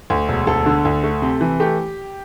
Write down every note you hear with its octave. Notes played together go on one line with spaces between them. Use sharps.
D2
E1
D2 A4
D3
D2
A3
C3
E3
A3 G4